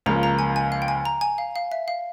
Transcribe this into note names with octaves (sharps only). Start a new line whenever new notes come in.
C#2 C#3 F3 A#3 A#5
A#5
G#5
G#5
F5
G5
G#5
A#5
G#5
F5
F5
E5
F5